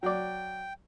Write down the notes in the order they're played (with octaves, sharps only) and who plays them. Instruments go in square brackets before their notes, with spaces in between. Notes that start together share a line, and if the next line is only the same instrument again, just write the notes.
[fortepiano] F#3 D5 [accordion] G5